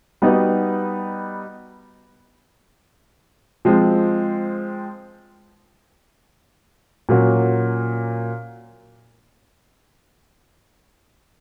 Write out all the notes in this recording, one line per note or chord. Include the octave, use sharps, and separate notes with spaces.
G3 B3 D#4 F#4 B4
F3 G#3 C4
A#2 F#3 A#3 C#4 F#4